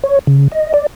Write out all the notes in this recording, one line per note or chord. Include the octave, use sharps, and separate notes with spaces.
C#5
C#3
D#5
D5